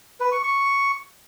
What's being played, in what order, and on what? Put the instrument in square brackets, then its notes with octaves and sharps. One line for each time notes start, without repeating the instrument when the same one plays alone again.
[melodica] B4
C#6
C#6